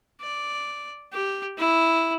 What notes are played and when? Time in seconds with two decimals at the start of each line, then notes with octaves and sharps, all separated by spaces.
0.21 D5
1.13 G4
1.58 E4